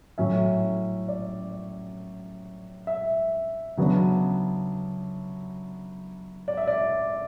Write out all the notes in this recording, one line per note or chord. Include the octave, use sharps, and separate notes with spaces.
A2 F#3 C#4 E5
D5
E5
C#3 F#3 B3 D4
D5
E5
D5